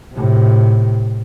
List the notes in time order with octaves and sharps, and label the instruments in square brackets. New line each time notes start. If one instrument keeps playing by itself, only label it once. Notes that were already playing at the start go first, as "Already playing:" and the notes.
[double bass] A2 C3